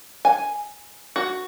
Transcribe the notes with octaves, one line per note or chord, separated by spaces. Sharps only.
G#5
F#4